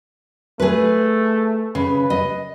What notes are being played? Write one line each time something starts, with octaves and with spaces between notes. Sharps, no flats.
A3 G#4 B4
C#3 B4
D#5